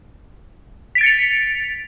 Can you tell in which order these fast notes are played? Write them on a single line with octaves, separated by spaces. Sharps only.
B6 D7 A6 C#7 F7